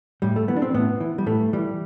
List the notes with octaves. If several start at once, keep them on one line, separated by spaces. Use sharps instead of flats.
A2 G3
A3
E3 B3
D4
C4
A2 B3
E3
G3
A2 A3
E3 G3